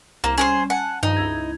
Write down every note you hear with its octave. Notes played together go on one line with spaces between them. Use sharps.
C2 A#3 E7
G3 C#4 G#4 A#4 C5
F#5 G#5 A5
G2 D#3 F3 D#4
C#2 E4 G#6